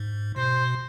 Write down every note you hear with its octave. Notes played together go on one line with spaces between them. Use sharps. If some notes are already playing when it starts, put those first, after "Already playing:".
Already playing: G#2
B2 C5